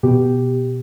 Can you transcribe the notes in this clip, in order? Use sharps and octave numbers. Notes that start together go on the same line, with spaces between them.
B2 G4